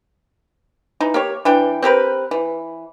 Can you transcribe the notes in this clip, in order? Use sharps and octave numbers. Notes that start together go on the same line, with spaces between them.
E3 D#4
A#3 G4 C#5
E3 D4 G5
C4 G4 A#4 B4
E3